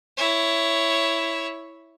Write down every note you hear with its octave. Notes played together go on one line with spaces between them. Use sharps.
E4 C#5